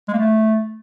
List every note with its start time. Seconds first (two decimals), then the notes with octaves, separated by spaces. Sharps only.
0.08 G#3
0.13 A#3
0.18 A3